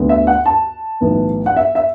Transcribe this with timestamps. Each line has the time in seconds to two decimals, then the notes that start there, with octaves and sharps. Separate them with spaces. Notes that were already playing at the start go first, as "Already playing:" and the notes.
Already playing: D2 D3 B3
0.09 E5
0.27 F#5
0.46 A5
1.01 B1 A2 E3 B3
1.46 F#5
1.56 E5
1.75 E5